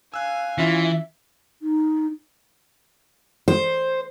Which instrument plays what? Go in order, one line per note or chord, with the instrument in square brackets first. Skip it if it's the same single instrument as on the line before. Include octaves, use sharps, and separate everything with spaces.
[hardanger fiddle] F5 G#5 [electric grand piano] E6 F#6
[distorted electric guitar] E3 [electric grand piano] C#4 E4 F4 [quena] E5
[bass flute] D#4
[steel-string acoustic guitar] C5